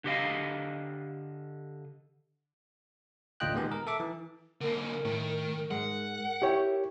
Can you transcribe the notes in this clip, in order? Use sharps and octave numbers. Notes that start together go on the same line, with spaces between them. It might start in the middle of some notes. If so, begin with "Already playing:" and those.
D3 G4 D#5 F5
A1 D2 F4 D#5 G5 F#6
A#2 D#3 G#3 B3 G4 G#4
A#4
A4 E5 D6
E3
D3 A#3 A#4
A2 D#3
G#2 G#3 F#5
E4 G4 C#5 G5